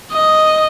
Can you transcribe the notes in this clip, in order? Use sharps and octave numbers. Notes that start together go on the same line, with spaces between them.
D#5